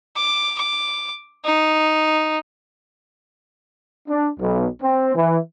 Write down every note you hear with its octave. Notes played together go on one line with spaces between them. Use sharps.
D6
D6
D#4
D4
B1
C4
E3